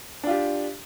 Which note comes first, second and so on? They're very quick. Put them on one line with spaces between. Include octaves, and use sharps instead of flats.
D4 F4 G4